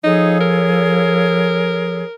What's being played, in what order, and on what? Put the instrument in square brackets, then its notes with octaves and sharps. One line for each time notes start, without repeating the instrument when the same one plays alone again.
[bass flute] F3 [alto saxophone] D#4 [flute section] G#4 A4 C#5
[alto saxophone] A#4